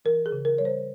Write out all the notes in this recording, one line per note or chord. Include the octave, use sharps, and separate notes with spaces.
E3 A#4
G#4
C#3
A#4
G3 C#5
C5